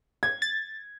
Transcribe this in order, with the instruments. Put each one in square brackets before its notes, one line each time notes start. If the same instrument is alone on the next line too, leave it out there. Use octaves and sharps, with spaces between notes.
[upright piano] G#6
[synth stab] A6